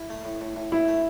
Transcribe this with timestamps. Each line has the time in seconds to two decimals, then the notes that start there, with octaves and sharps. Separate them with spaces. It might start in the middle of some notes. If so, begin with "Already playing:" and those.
Already playing: E4
0.10 A3
0.25 A2
0.41 A2
0.56 A2
0.72 A2 E4
0.88 A3